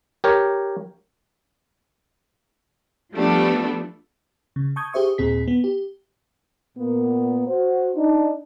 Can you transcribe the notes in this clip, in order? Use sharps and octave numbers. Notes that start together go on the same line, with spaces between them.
G4 A#4 C#5
F3 G3 A3 B3 D4 A4
C#3
A5 C#6 D#6 G6 G#6
G4 G#4 C5 E5 C#6 D#6
D#2 A#2 C4 G#4 B6
B3
G4
A#2 A#3 B3
F#4 C5
D4 D#4